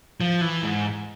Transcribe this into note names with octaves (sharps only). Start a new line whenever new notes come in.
F3
E3
G#2